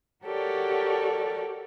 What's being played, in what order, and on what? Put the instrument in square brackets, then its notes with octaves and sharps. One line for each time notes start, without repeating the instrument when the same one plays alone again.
[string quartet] F#4 G4 A4 A#4 C#5 D5